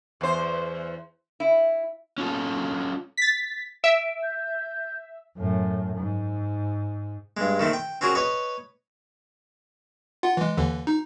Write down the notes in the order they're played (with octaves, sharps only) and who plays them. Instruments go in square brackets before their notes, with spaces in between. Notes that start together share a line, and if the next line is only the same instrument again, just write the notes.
[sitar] E2 C5
[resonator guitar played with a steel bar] E4
[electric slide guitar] C#4 F4 A4
[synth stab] A6 B6
[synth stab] E5 [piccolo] D7
[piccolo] G6
[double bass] F#2 A2
G#2
[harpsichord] G2 G#3
D#3 A3 C4
G5
C4 C#4 F#4 G#4 A#4
B4 C#5 D#5
[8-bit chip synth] F4 F#5
E3 G#3
D#2 D3 E3
D#4